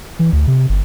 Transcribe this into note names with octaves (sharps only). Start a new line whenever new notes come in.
E3
D2
C3
G1